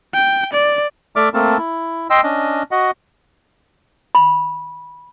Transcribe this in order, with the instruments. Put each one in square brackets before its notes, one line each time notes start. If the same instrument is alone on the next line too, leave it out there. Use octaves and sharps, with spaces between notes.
[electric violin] G5
D5
[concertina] A3 A4 D5 E5 D6 F6
A3 A#3 C4 A4 A#4 A5
E4
D#5 G5 C6 E6
C#4 D4 D#5
F#4 D#5 F#5
[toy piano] B5